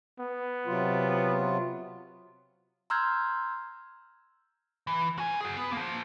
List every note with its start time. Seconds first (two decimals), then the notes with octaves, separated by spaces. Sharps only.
0.19 B3
0.66 C3 F#3 F4
2.90 A#5 C6 E6 F6 G6 G#6
4.87 E3
5.18 F#4 G#5
5.41 F#4 G#4
5.57 B3
5.73 F3 A#3